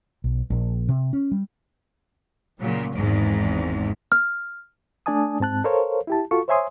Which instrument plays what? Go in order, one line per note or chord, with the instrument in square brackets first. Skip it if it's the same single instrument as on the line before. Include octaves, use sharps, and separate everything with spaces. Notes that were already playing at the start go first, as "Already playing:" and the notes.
[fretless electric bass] B1
A#1
C3
C#4
G3
[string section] A#2 C#3 F#3
G#1 E2 G#2
[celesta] F6
[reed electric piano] A3 D4 D5 G#5 A5 D#6
G#2 C4 A5 F#6
A4 A#4 C5 C#5 F5
E4 G4 A5
F4 F#4 A4 C#6
C5 C#5 E5 G#5 C6 D#6